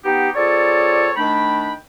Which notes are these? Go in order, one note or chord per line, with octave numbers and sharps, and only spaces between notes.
B3 D#4 G4
C4 F4 G#4 A4 C#5 D5
D#3 A3 D4 G5 B5